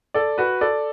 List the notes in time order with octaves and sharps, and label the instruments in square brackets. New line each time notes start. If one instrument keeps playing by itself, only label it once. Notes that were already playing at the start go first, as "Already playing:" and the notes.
[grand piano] A4 D5
F#4 B4
A4 D5